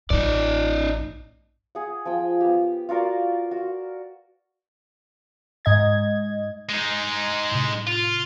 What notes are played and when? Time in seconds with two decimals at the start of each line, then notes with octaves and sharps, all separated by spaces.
0.10 A1 A2 D#4 D5
1.75 G#4 F#5
2.05 F3 G#4 G5
2.41 B3 G4
2.89 F4 F#4 A#4 D5
3.51 F#4
5.65 G#2 D#5 G#6
6.69 G#3 D#4
7.51 A2 C3
7.87 F4